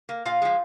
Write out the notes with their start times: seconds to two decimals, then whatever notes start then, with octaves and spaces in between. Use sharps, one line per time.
0.09 A#3
0.25 A#2 F4 F5
0.42 F3 G#3